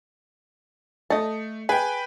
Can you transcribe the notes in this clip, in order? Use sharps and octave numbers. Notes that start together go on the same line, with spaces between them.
A3 D#5 A5
G#4 B4 G5